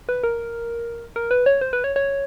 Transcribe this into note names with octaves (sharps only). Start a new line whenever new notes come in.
B4
A#4
A#4
B4
C#5
C5
B4
C#5
C#5